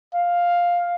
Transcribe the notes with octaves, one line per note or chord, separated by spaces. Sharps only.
F5